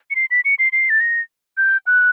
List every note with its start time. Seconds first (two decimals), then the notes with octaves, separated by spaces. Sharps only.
0.11 C#7
0.15 C7
0.31 B6
0.45 C#7
0.59 C7
0.72 C7
0.90 A6
1.00 A#6
1.57 G6
1.86 F#6